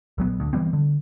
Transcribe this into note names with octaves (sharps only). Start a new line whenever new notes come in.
A#1 F#3 B3
D2
E3 G3 B3 C4
D3